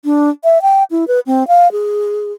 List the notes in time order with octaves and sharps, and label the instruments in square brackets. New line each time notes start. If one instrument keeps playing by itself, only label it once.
[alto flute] D4
E5
G5
E4
B4
C4
F5
G#4